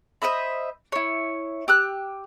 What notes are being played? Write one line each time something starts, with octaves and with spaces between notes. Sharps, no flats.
C5 D#5 E5 B5
E4 C#5
G4 E6 F#6